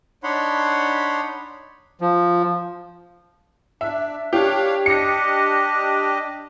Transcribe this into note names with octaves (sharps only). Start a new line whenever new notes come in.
D4 D#4 C#5 F#5 B5 C6
F3
D4 E5
D4 G4 C#5 F5
D4 G4 D#5 A#6 C#7